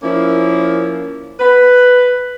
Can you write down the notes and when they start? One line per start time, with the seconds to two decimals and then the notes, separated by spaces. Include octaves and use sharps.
0.03 F3 A#3 C#4 E4
1.39 B4